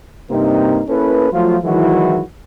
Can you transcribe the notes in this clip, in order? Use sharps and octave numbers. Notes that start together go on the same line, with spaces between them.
G2 C3 A#3 C4 D#4
A#3 C#4 E4 A4 B4
F3 F#3 A3 F4
D#3 E3 F#3 G#3 E4 F#4